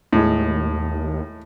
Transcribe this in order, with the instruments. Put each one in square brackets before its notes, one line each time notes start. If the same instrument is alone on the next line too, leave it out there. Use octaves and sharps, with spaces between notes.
[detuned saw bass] D#2 [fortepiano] A2 G#3